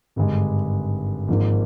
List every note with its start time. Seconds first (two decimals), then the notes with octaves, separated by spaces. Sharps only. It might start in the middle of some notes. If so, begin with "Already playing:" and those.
0.16 G#1 G2 D3 G#3
1.28 G#1 G#2 F3 A#3